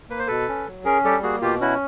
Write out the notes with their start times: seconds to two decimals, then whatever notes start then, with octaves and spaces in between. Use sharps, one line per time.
0.10 A#3 B4
0.19 C5
0.27 B2 A4 B4
0.48 C#4
0.67 F#3
0.85 C#4 G#4 A#4
1.04 G3 G4 A4
1.23 A#3 F#4 G#4
1.42 B2 F4 G4
1.61 C#4 E4 F#4